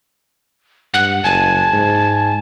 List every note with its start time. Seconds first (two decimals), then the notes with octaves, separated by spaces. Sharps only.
0.94 G2 F#5
1.24 F#1 G#5 A5
1.73 G#2